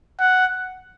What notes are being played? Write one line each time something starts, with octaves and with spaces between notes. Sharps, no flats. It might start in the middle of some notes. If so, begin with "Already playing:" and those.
F#5